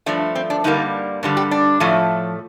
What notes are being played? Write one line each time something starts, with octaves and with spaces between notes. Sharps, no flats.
G2 F3 A3 D4
C4
D4
G2 D3 G3 A#3 D#4
G2 D3 G3
G4
D4
A2 F3 A3